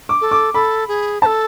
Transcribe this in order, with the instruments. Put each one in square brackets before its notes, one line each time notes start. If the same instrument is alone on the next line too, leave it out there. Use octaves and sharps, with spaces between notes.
[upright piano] D6
[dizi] A4
[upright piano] D6
[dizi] A4 [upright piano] B5
[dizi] G#4
[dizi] C5 [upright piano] A5
[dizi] A4